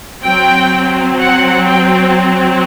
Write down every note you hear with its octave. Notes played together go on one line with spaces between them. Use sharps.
F#3 C4 G5
F#5
G5